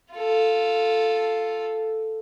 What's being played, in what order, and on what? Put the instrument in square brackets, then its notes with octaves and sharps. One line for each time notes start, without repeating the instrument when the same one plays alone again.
[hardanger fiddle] F4 A4